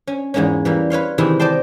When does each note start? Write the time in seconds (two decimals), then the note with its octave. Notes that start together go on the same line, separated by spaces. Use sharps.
0.07 C#4
0.34 E2 G#2 G#3 A#3 C#4
0.65 E3 G3 A#3
0.90 B4 C#5 F5 C6
1.18 C3 D#3 E3 E4 G4 G#4
1.40 C5 D5 D#5 G5 A5 C6